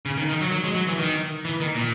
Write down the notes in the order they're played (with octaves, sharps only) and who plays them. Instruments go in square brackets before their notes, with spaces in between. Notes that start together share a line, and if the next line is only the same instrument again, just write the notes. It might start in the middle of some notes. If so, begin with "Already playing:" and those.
[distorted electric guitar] C#3
D#3
D#3
F#3
F#3
G#3
F#3
E3
D#3
E3
D#3
A#2